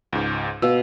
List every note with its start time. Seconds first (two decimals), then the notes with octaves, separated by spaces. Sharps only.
0.13 C#2 G#2
0.62 B2 F5 E6